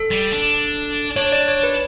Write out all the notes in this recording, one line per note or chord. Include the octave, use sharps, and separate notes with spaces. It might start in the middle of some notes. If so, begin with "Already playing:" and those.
Already playing: A4
G3
D4
D4 C#5
D5
C#5
B4